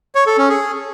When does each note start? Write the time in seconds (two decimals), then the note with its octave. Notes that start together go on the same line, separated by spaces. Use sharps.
0.15 C#5
0.27 A4
0.38 C#4
0.49 G#4